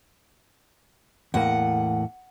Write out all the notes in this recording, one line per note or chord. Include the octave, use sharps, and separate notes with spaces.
E2 A2 A#3 F#5